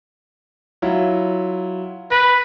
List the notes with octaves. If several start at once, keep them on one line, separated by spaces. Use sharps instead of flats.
F#3 E4 F4
B4 A#6